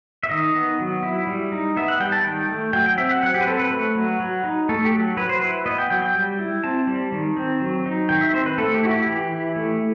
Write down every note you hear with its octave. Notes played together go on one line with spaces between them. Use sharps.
E5
D#3 D#5
B3
F#3
E4
G3
D#4
B3 E5
F#5
G3 G5
A5
D#3 G5
A3
F#3 G5
G5
C4 E5
F#5
F#3 F#5
G4
B4
C4 A4
B4
A3 B4
F#3
F#3
D#4
A3 A4
G4
F#3
F#3 B4
C5
E4 B4
B3 D#5
G5
F#3 G5
G5
G3
E4
C4 A5
G3
D#3
C4
F#3
D#4
D#3 G5
E5
C4 C5
B4
A3 A4
G4
E4 F#4
G4
E3 G4
E4
A3